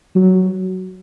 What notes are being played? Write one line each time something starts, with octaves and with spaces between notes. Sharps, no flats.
F#3